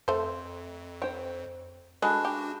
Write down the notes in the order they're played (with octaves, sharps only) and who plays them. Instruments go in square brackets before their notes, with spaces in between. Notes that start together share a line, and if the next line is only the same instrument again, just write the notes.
[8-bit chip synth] F2 [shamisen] A3 C5
[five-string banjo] C5 G5 [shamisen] C#5
[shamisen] D3 D#5 [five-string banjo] G#3 [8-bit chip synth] D4 F#4 [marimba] A5 B5 F#6
[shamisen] G4